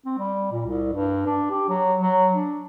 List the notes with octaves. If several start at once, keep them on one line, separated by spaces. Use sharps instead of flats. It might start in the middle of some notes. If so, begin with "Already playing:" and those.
C4
G3
A#2
C2
G2
D4
G4
F#3
F#3
D4